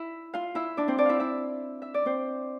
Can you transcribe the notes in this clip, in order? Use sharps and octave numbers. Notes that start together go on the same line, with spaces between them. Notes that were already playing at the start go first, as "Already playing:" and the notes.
Already playing: E4 E5
F4 F5
E4 E5
D4 D5
C4 C5
D4 D5
E4 E5 F5
E4 E5
E5
D5
C4 C5